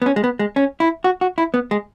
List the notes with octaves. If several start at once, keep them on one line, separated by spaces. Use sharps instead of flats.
B3
C#4
G#3
B3
G#3
C#4
E4
F#4
F#4
E4
B3
G#3